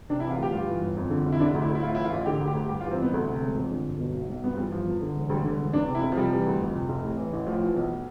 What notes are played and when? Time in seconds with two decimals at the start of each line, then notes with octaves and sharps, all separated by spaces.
0.09 C3 D4
0.20 E4
0.24 E3
0.31 F4
0.38 D2 G4
0.52 G2 F4
0.67 E3
0.81 G1
0.97 F2
1.10 D3
1.26 F1
1.32 E4
1.40 D3 D4
1.55 D2
1.62 E4
1.69 D2
1.75 E4
1.82 A2 F4
1.95 E3 E4
2.04 F4
2.12 A1
2.26 D3 G4
2.41 D2
2.48 G4
2.55 D2
2.69 G2 G4
2.81 F4
2.84 E3
2.91 C4
2.98 A1 B3
3.13 D2 A3
3.28 C3
3.42 E1
3.56 F2
3.72 D3
3.86 G1
4.00 B2
4.15 B1
4.29 B1
4.44 G2 B3
4.52 F3
4.57 E3 G3
4.72 G1 F3
4.87 E2
5.02 D3
5.15 E1
5.29 D2 G3
5.44 D3
5.59 E1
5.73 E2 D4
5.88 C3
5.95 E4
6.02 F1
6.12 F3
6.17 C3 G3
6.32 E3
6.46 D2
6.60 F2
6.74 C3
6.89 F1
7.04 A2
7.18 E3
7.33 A1
7.47 A2 F3
7.61 E3
7.76 B1